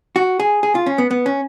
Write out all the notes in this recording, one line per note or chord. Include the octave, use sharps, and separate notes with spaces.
F#4
G#4
G#4
F4
C#4
B3
B3
C#4